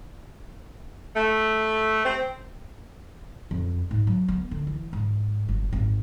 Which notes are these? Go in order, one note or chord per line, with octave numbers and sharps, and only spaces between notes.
A3
C4
F2
G#2
F#3
B3
D3
E3
G#2
G1
G#1